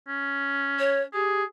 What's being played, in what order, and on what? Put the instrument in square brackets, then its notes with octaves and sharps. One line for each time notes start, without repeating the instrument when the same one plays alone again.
[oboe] C#4
[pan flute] C#5
[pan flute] G4 [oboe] G#4